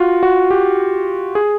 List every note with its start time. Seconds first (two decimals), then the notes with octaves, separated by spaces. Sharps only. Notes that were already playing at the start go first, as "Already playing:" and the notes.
Already playing: F4 F#4
0.23 F#4
0.50 G4
1.35 G#4